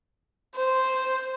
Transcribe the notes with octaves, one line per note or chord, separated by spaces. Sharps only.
C5